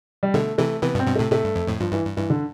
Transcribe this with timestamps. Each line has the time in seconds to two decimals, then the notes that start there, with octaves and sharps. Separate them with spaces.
0.23 G3
0.34 B2 D3 A3
0.58 C3 E3 A3
0.82 C3 E3 B3
0.95 G2 B2
0.99 C4
1.07 G2 B2
1.15 A2 C3 A3
1.32 A2 C3 A3
1.44 G2
1.56 F2
1.68 F2 A2
1.80 G2 F3
1.93 G2 E3
2.05 G2
2.17 G2 E3
2.30 D3